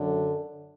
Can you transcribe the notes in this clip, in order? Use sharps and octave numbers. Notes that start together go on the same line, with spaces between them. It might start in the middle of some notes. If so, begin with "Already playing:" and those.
Already playing: F#2 D3